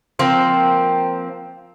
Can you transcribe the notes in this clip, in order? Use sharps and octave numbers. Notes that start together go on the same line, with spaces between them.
F3 A#3 C4